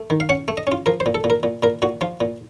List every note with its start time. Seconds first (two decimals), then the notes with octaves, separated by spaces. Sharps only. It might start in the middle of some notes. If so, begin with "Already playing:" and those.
Already playing: A3
0.10 D#3
0.20 F5
0.29 C#4 F#5
0.48 A3
0.57 D#5
0.67 C#4 F4
0.86 F3 A#4
1.00 C5
1.06 A#2
1.15 A4
1.24 A#2
1.30 A#4
1.43 A#2
1.63 A#2 A#4
1.82 A#2 F#4
2.01 F3 F4
2.21 A#2